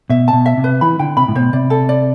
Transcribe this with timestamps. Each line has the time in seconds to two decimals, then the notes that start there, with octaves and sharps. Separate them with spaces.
0.10 B2 E5
0.28 A5
0.33 B2
0.46 E5
0.57 C3
0.64 B4
0.81 E3 B5
0.99 D3 G5
1.17 C3 B5
1.28 A2
1.35 B2 C5
1.53 C3 D5
1.70 A4
1.89 D5